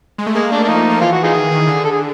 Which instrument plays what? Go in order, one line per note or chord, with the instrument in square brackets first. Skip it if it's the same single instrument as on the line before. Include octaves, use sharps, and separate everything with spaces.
[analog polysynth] G#3
A3
[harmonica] G#3 [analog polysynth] A#3
[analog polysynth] A3 [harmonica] D4
[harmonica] D4
[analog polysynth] F3 [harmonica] D#4
[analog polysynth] F3
F3
[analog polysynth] E3 [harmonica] F4
[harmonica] F#4
[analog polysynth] E3
[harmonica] D#4 F4 G#4
[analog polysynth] D#3
D#3
D3
[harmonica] A4
G#4